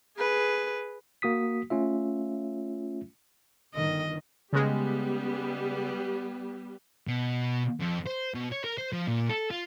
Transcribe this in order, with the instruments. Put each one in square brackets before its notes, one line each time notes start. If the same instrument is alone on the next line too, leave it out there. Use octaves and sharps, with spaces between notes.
[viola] G#4 B4
[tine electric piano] A#3 F#4 D#6 B6
A3 C#4 F4 E5
[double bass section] G1 D#3 [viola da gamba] D#5
[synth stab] C#3 G#3 [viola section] G3 B3 G4
[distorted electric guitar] B2
F2
C5
B2
C#5
A#4
C5
F3
A#2
A4
F4